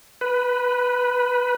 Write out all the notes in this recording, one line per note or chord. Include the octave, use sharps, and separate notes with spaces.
B4